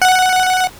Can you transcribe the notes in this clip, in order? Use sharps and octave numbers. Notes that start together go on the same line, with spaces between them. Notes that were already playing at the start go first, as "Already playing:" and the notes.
F#5